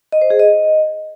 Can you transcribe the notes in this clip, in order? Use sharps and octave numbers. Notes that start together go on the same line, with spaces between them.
D#5
C5
G#4
D#5